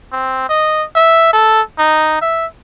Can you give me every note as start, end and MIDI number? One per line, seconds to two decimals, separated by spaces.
0.12 0.47 60
0.49 0.84 75
0.95 1.33 76
1.33 1.61 69
1.79 2.18 63
2.22 2.46 76